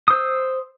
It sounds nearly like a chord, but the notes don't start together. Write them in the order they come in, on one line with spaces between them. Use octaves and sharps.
D#6 C5 E6